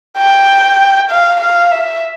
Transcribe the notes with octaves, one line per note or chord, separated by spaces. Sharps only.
G5
F5
F5
E5